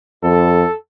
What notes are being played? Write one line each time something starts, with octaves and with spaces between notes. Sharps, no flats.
F2 A4